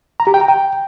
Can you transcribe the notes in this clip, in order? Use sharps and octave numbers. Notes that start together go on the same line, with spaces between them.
A#5
G4
G5
A#5
G5